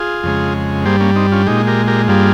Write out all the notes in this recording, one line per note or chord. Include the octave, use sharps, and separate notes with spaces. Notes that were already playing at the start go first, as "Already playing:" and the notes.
Already playing: F4 G#4
F2 C#3 G#3
G2 G3 A#3 G#4 C5
A#3 C#4
C4 D#4
C#4 F4
A#2 G#3 D#4 G4
G4 A#4
G4 A#4
G2 G3 A#3 F4 G#4